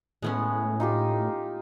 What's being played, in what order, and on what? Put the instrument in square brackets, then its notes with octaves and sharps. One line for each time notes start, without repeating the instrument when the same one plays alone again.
[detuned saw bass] A2 [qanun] G#3 B3 C#4
[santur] D#4 F4 G4